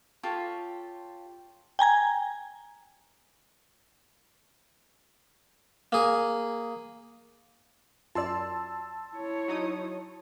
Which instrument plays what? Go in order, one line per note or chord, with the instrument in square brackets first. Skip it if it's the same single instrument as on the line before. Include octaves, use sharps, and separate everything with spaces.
[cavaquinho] F4 G4 A4 C#5
[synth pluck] G5 G#5 A#5 G#6
[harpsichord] A#3 G#4
[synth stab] F#2 [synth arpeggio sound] F4 D5 [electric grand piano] A5 C6 E6
[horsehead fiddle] E4 C#5
[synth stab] F#3 D#4 D#6